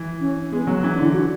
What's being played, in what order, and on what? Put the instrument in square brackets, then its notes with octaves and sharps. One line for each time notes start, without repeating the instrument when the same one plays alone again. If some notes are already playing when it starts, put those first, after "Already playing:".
Already playing: [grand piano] E3
[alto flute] C#4
[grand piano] G#3 [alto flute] B3
[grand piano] F#3
[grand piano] E3 [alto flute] C#4
[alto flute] D4
[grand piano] D3 [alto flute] E4
[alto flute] F#4